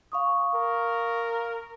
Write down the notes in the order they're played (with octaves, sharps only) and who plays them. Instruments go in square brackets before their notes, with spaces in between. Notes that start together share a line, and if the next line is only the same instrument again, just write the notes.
[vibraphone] F5 C#6 D#6
[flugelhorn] A#4